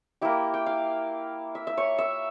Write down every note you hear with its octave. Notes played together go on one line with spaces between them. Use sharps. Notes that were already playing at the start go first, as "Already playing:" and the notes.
A#3 E4 G4
G5
F5
E5
E5
C#5
E5